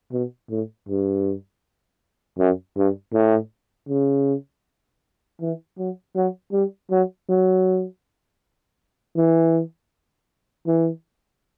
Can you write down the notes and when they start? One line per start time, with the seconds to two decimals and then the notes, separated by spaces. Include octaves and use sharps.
0.12 B2
0.50 A2
0.89 G2
2.38 F#2
2.77 G2
3.14 A2
3.89 C#3
5.41 E3
5.78 F#3
6.16 F#3
6.53 G3
6.91 F#3
7.29 F#3
9.17 E3
10.67 E3